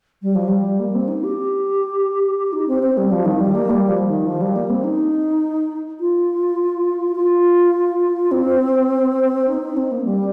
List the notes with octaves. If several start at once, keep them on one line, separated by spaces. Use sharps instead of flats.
G3
F3
G3
A#3
C4
D#4
G4
D#4
C4
C4
G3
F3
D#3
G3
A#3
G3
F3
D#3
F3
G3
A#3
C4
D#4
F4
F4
C4
D#4
D#4
C4
A#3
G3